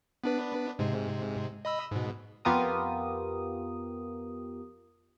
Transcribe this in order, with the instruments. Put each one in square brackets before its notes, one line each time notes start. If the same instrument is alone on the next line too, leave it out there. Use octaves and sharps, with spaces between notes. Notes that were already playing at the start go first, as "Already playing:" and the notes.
[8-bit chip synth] B3 D4 B4
G#2 C3 G#3
D#5 B5 E6
G#2 B2
[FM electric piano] F2 B3 F4 G4 A#4 D#6